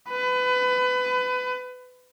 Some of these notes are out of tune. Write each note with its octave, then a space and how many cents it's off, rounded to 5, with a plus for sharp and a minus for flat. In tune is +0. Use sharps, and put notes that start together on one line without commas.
B4 +25